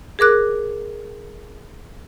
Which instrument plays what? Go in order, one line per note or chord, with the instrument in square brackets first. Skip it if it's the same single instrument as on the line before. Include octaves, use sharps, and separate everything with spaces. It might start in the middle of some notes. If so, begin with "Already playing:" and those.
[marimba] G#4 A#4 D6 F#6